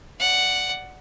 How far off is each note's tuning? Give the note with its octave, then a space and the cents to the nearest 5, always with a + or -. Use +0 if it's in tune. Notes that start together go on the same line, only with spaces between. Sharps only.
D5 +0 F#5 +0